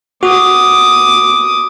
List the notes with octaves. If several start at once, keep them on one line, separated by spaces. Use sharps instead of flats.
F#4 D6 D#6